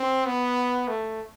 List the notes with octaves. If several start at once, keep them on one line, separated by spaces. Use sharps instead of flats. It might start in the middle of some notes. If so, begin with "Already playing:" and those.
Already playing: C4
B3
A3